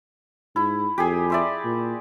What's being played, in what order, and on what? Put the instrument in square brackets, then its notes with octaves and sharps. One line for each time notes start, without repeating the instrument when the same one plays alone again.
[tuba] G#2 [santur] E4
[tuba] F2 [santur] G4 G#4
[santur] D5 E5 C6
[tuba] A#2